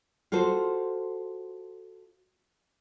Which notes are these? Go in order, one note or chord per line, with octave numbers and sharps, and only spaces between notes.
F4 F#4 A4 C5